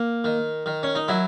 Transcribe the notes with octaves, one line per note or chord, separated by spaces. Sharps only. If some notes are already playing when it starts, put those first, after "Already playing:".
Already playing: A#3
D#3
D#3
C#4
D#4
F#3 E4